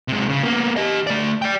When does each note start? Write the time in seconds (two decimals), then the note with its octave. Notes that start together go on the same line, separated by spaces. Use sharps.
0.08 C3 G#3
0.29 C#3
0.43 A#3 B3
0.76 G4 D#5
1.07 A3 D5
1.42 D5 G5